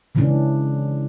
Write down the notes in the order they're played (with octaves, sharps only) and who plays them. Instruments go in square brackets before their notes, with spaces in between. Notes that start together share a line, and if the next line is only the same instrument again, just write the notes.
[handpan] C#3 E3 G#3 C#4 D4